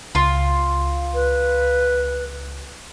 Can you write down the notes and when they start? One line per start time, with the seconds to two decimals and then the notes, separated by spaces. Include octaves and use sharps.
0.15 C#2 F4
1.14 B4